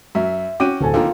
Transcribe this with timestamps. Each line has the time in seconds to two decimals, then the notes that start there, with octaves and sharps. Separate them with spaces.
0.15 F#2 E5
0.60 C#4 F#4 G5 D6 D#7
0.81 D1 A4 G#5
0.94 D3 D#3 A#3 F4